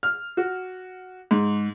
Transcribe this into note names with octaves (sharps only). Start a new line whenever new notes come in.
F6
F#4
G#2